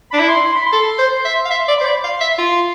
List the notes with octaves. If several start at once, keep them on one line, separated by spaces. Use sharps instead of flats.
D4 B5
E4
C6
C6
B5
C6
A4
C5
E5
F5
E5 C6
D5
C5 B5
D5
F5 C6
E5
F4